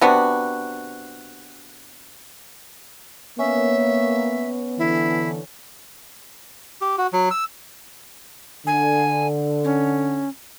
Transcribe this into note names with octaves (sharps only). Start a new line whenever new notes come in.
C3 B3 D4 F#4
A#3 B3 C#4 E5
D3 E3 E4
G4
F#4
F#3
E6
D3 G#5
C#4